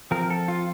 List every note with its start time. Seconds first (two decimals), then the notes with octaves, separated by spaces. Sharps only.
0.11 F3 C4 A#4
0.30 A4
0.48 F4